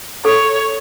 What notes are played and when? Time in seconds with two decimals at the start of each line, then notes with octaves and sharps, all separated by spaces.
0.25 A4 C#5